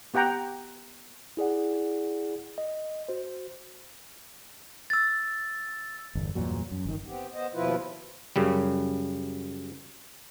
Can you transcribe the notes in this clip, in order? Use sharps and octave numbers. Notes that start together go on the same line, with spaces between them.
B3 G4 F#5 G5 A#5
E4 G#4 D5 F#5
D#5
F#4 C5
E6 A6
G1 E2
E2 G2 A#2 F#3
F#2
G1 D#3
B3 C4 G4
B3 C5 D#5
D#2 B2 F3 E4 F4 B4
F#2 C#3 G3